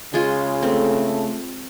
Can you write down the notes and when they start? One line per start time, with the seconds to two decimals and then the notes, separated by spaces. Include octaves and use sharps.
0.14 C#3 G#3 F4
0.63 A3 C4 A4